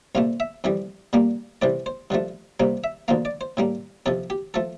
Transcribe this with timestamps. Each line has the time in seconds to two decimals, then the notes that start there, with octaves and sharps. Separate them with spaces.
0.15 C2 A#2 A3 F5
0.40 E5
0.64 F2 E3 G3
1.13 A#2 G3 A#3
1.62 C2 C3 E3 D5
1.86 C5
2.10 G2 D3 F3 A3
2.60 C2 C3 G3 A#3
2.84 E5
3.08 D2 D3 F3 A#3 F5
3.25 D5
3.41 C5
3.57 A2 G3 A#3
4.06 F2 C3 F3 A4
4.30 G4
4.54 F3 A3 A4